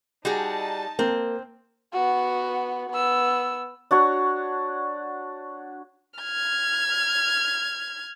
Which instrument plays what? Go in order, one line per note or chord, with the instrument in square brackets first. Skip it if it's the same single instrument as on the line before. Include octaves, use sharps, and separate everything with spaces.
[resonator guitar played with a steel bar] G3 F#4 G#4 [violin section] D#4 A5
[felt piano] A#3 [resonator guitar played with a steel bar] C4
[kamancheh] B3 F#4
B3 E6
[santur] D4 F#4 C#5
[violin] F6 G#6